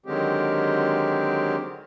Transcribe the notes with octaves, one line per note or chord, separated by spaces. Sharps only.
D3 D#3 F#3 G#3 C4 G4